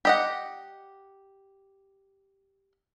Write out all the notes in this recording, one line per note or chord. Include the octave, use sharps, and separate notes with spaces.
G4 D#5 F#5